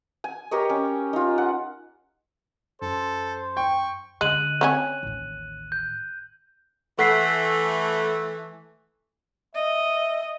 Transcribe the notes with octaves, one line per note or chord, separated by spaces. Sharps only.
G#5
G4 A#4 C#5 D#5
C#4
D#4 F4
F#5
F#2 A4 C5
G5 C#6
D2 D3 G#3 F#6 D#7 F#7
C4 C#4 G#5
A1 D#2
G6
E3 A3 F#5 B6 C7
D#5 E5